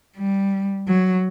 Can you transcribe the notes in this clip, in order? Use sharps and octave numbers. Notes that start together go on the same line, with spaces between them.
G3
F#3